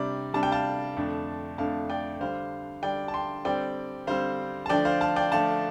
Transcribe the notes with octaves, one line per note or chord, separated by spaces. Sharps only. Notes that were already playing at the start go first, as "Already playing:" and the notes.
Already playing: C3 G3 D4 D5
C3 G3 D4 A5
G5
F5 A5
F2 D3 A3 D4
F2 D3 A3 D4 F5 A5
D5 G5
D3 G3 D4 C5 F5
D3 G3 D4 D5 G5
A5
G5 C6
D3 G3 C4 D5 G5
D3 G3 C4 C5 F5
A5
D3 F3 A3 D4 D5 G5
C5 F5
F5 A5
D5 G5
D3 F3 A3 D4 F5 A5